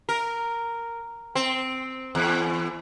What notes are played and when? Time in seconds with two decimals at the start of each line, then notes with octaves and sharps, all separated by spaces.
0.09 A#4
1.35 C4
2.15 E2